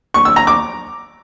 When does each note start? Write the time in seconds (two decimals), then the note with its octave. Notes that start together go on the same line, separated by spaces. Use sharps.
0.14 C#6
0.25 E6
0.36 A#5
0.47 D6